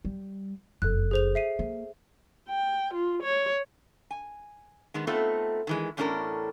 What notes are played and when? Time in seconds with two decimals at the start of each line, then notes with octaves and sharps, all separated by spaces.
0.05 G3
0.82 F#1 F2 A4 F#6
1.11 G#4 C5 F7
1.35 E5 C7 D#7
1.59 A#3
2.49 G5
2.94 F4
3.23 C#5
4.11 G#5
4.94 D#3 G#3 B3
5.07 A3 B3 C4 D#4 F4 A4
5.67 D#3 E3 G#3
5.97 E2 A2 C#4 D4 A4 A#4